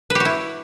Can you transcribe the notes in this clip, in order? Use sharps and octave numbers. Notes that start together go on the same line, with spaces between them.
B4
G4
F#4
E4